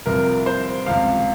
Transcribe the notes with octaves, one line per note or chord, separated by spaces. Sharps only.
C2 C3 F3 A#4
C5
C#2 C3 F3 F5